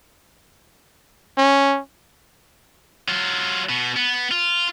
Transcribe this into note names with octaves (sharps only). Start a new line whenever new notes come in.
C#4
F#3 F4
B2 B3
B3
F4